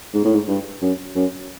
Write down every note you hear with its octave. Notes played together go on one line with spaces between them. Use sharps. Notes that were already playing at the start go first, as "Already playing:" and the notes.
G#2
A2
G#2
G2
F#2
F#2